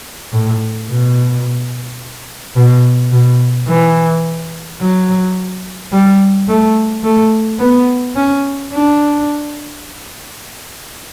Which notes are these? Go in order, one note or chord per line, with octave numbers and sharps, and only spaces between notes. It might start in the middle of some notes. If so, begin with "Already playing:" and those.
A2
B2
B2
B2
E3
F#3
G3
A3
A3
B3
C#4
D4